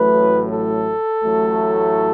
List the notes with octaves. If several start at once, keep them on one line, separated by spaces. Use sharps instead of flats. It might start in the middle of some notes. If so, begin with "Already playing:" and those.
Already playing: A1 A2 F#3 A3 B4
A4
A1 A2 F#3 A3